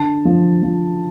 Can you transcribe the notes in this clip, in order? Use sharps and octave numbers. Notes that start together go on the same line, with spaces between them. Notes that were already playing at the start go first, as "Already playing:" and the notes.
Already playing: D3 A5
F3
F3